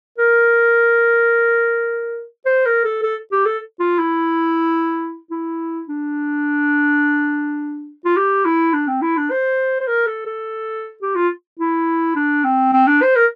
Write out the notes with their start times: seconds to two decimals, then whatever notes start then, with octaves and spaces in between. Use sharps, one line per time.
0.18 A#4
2.46 C5
2.66 A#4
2.84 A4
3.03 A4
3.32 G4
3.45 A4
3.80 F4
3.99 E4
5.31 E4
5.89 D4
8.05 F4
8.17 G4
8.45 E4
8.73 D4
8.87 C4
9.02 E4
9.17 D4
9.31 C5
9.80 C5
9.87 A#4
10.06 A4
10.26 A4
11.02 G4
11.16 F4
11.59 E4
12.16 D4
12.44 C4
12.73 C4
12.87 D4
13.02 C5
13.16 A#4